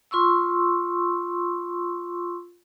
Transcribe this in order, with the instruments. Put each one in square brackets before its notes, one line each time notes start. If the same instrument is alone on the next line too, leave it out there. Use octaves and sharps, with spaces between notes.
[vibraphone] F4 C6 C#6 E6